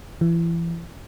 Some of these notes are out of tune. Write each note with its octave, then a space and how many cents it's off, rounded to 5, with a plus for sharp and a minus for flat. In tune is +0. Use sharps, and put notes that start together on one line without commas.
E3 +30